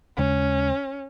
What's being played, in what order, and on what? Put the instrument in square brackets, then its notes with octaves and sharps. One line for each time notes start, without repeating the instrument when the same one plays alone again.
[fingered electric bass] D#2 C#3 G#3 [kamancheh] C#4